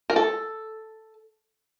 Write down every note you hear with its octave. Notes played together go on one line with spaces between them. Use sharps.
A#4
A4